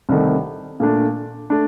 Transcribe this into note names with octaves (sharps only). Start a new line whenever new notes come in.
C2 C3 D#3 A3
A#2 A3 D4
A3 D4